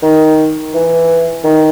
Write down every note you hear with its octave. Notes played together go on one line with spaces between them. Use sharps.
D#3
E3
D#3